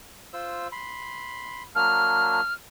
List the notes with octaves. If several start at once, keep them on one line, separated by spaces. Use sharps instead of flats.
F4 C5 E6
B5 C6
F#3 A#3 D4 F6